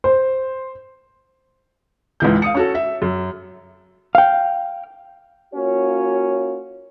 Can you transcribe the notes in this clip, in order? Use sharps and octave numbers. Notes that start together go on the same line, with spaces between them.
C5
C#2 G#2 E3 G6
F5 D#6 C#7
C#4 F#4 A4
E5
F#2
F5 G5
A#3 C#4 F4 F#4 C#5